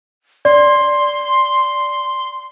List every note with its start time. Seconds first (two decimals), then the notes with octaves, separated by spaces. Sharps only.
0.45 D5 C6